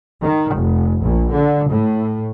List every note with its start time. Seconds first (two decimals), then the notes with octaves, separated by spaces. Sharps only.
0.22 D#3
0.55 F1
1.01 A#1
1.30 D3
1.70 A2